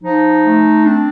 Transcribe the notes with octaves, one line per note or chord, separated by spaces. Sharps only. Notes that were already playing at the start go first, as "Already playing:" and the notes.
F3 D#4
A3
C4 D4